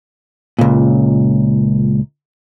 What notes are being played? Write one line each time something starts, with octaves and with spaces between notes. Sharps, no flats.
C#2 A#2